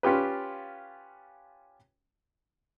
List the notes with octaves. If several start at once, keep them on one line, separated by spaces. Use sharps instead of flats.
C#4 F4 G4 B4